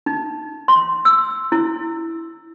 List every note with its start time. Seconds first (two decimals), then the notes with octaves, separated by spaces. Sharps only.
0.06 D#4
0.68 C6
1.05 E6
1.52 E4